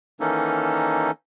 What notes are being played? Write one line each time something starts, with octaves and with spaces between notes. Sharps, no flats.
D#3 E3 A#3 C#4 D#4 A4